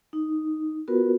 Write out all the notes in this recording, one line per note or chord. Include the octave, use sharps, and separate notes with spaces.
D#4
B3 F4 F#4 A#4 B4